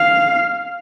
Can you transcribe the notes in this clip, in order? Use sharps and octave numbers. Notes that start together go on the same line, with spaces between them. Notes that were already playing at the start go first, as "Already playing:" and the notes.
Already playing: F5